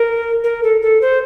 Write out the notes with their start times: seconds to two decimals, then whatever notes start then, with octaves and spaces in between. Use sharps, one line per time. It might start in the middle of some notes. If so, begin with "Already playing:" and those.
Already playing: A#4
0.44 A#4
0.63 A4
0.82 A4
1.02 C5